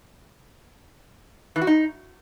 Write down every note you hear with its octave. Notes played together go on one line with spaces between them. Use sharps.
E3
F#4
D#4